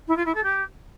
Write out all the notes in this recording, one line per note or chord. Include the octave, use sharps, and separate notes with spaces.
E4
F4
E4
A4
G4